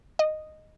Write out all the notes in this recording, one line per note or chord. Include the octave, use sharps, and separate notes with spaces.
D#5